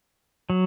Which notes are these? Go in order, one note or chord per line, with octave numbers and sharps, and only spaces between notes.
F#3